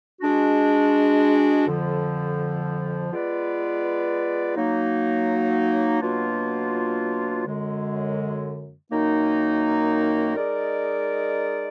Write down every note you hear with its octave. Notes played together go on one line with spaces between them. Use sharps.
G#3 D4 F#4
F2 D3 F3
G#3 B3 F4 B4 D5
F#3 A#3 D#4
B2 F#3 A#3 D4 F4
F#2 D3 G#3
F#2 D#3 A#3 D#4
G#3 D#4 A#4 D5